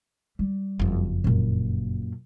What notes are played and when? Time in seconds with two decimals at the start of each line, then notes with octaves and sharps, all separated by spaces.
0.39 G3
0.79 F#1 F2
1.24 F#2 A#2